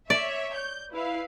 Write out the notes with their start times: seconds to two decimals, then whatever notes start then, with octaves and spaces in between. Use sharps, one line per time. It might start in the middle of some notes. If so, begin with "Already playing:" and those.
0.10 C#5 D5 E5
0.56 G6
0.93 E4 B4 F5